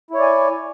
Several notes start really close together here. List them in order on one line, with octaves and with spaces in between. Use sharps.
E4 C#5 D5 G#5